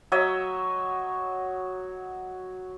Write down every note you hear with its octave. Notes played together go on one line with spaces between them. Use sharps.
F#3 C#5 D#5 E5